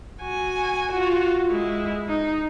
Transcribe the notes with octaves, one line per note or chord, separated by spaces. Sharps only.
F#4 G#5
F4 F#4
G#3 E4
D#4